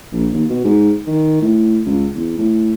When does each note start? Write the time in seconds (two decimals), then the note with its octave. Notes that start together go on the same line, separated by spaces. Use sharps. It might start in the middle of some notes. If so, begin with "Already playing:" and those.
0.13 A#1
0.32 D#2
0.49 B2
0.64 G#2
1.07 D#3
1.41 A2
1.86 C#2
2.15 E2
2.38 A2